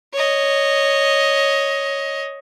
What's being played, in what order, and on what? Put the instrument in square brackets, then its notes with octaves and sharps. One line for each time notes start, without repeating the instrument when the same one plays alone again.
[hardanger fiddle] C#5 D#5